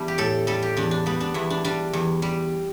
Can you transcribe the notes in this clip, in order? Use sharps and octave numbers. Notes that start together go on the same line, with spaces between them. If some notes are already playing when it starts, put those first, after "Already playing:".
Already playing: E2 G3 D4 E4
G4
A2 A4
G3 A4
G4
E2 D4
D4
G3 B3
D4
E2 E4
D4
G3 D4
E2
G3